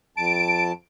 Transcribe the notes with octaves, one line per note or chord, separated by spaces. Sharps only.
F2 A5 D7